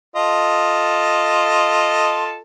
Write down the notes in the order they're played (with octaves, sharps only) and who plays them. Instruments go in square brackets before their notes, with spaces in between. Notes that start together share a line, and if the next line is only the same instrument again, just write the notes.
[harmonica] F4 A4 D#5